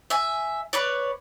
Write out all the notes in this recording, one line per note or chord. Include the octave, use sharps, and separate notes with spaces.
E5 G#5
B4 C#5 D5